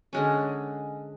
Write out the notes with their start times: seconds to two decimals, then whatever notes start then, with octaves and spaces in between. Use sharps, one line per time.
0.13 D3 G#3 C#4